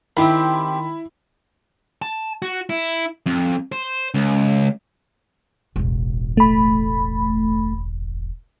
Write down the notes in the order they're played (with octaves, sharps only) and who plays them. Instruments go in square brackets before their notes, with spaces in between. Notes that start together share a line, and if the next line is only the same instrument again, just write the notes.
[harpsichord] D#3 [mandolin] C4 G4 C6 [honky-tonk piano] E4 B5
[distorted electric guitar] A5
F#4
E4
F2
C5
C#2
[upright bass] E1 A1
[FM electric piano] A3 B5